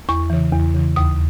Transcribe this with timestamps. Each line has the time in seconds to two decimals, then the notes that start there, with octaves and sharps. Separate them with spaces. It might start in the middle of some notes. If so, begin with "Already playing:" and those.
0.09 E2 C#6
0.30 C#3 E3
0.52 E2
0.74 C#3 E3
0.96 D#2 D#6